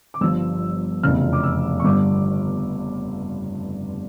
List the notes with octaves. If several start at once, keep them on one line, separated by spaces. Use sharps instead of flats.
D6
G1 G2 F3 E6
F1 E2 C#3 F3 F6
D6
E6
C#6
G1 G2 D3 D6